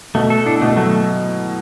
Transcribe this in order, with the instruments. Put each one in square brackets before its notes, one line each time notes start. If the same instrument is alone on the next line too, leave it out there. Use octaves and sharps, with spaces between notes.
[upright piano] B2 [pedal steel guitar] A3
[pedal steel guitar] A4
[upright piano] A2 [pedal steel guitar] D4
[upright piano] B2 [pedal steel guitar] A3
[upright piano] F#3 [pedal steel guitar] A3